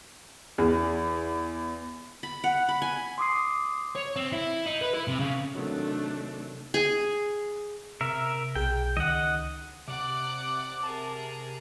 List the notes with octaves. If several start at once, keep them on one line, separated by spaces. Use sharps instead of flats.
E2
B5
F#5
B5
G#5
C6 D6 D#6 C7
C#5
C4
E4
D#4
B4
E4
C3
C#3
C3 D#3 F#3 A3 D4
G#4
C3 A#4 E5
B1 G#4 G5
C#2 D#3 D#5 F#5
C3 D5 F#5 D6
G#4 A#4 A5